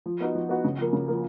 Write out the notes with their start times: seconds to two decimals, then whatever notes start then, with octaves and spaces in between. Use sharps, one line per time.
0.06 F3
0.20 B3 D#4 F#4
0.35 F3
0.49 B3 D#4 F#4
0.64 C#3
0.78 F3 A#3
0.93 C#3
1.08 F3 A#3